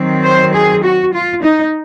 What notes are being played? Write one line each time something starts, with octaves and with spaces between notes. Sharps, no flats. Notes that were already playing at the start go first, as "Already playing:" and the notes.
Already playing: D#3 F#3 C4
C5
G#4
F#4
F4
D#4